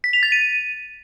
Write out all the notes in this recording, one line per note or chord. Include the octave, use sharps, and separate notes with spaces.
B6
F7
A6
D#7